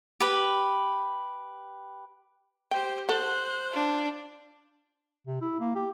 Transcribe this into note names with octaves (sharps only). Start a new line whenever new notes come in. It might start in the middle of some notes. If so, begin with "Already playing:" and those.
G4 B4
G4 C5 G5
A4 C5 F#5 F#6
D4 F4
C3
E4
A#3
G4